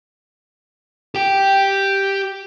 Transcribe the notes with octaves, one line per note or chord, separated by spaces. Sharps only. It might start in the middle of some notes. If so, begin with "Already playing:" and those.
G4 G5